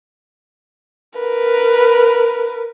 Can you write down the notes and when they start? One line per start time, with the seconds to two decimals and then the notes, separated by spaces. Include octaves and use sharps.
1.19 A#4 B4